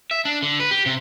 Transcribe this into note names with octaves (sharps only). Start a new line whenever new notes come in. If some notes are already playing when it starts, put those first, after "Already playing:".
E5
D4
D3
B4
G4
C3